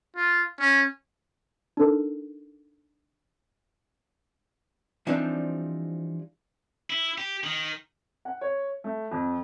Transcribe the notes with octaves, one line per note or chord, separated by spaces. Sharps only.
F4
C#4
D4 D#4 A4 A#4
E3 F3 G3 C4 D4 D#4
E4
G4
D#3
F#5
C#5
A3
F2